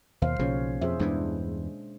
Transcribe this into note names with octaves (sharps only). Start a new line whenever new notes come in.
D#2 B2 C5 F5
B1 C#3 F3 A#3 C#4 C#5
F2 G#4 C5 E5
E2 G2 E3 G#3 D4